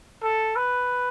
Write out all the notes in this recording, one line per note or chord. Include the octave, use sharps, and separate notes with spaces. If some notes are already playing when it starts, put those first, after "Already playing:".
A4
B4